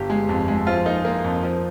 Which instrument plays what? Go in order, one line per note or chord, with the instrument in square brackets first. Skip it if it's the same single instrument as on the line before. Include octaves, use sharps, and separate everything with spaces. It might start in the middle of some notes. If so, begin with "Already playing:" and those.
Already playing: [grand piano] G1 G4
G#3
F2
G#3
F3 F4
A#3 D#4
A#3
F2
F3